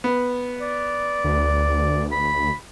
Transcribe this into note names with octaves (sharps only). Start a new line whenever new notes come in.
B3
D5
D2
B5